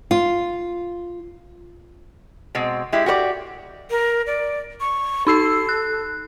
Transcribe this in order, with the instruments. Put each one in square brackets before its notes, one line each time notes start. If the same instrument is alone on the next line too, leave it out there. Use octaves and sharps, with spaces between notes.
[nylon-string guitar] F4
[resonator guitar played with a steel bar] B2 G#3 C4
G#3 E4 G4
F#4 G4 C5 D5
[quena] A#4
D5
C#6
[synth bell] D#4 E6 C7 [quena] A4
[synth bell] F#6